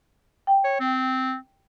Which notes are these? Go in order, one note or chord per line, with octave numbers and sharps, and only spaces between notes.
G5
C#5
C4